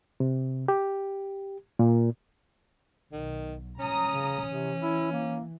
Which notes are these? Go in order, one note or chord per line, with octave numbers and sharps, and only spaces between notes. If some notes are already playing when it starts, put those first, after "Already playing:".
C3
G4
A#2
B1 D#3
C#4 A#5 D#6
C#3
C3 E3
E4
A#3